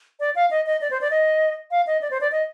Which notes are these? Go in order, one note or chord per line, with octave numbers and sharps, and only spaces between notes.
D5
F5
D#5
D#5
D5
C5
D5
D#5
F5
D#5
D5
C5
D5
D#5